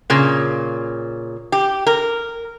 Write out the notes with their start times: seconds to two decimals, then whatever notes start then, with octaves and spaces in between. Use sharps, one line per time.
0.10 A#2 C#3
1.52 G4
1.87 A#4